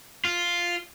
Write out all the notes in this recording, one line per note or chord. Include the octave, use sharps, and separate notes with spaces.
F4